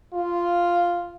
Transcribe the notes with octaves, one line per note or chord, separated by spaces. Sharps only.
F4